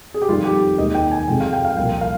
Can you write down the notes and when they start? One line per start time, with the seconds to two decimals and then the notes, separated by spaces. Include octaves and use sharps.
0.14 G#4
0.22 G4
0.29 F2 D#3 G3 F4
0.45 G4
0.78 D#2 D#3 G#3 D#5
0.95 G5
1.12 G#5
1.28 F2 C3 F3 G#3 G5
1.40 F5
1.53 G5
1.65 F5
1.76 C2 A#2 F3 G5
2.01 F5